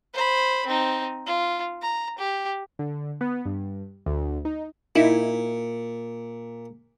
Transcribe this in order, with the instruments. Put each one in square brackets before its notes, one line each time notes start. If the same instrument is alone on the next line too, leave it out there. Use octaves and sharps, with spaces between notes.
[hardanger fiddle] C5 B5
C4 D#4
F4
A#5
G4
[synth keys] D3
B3
G2
D2
D#4
[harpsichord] A#2 [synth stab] D#4 E4